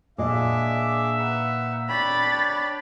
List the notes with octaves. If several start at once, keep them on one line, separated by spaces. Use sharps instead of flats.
A#2 D4 G#4 D#5 E5 D6
D#4 B4 F#5
D4 C#5 G5 B5 A6